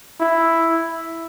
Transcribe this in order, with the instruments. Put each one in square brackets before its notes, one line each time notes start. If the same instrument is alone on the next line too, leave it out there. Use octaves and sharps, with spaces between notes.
[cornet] E4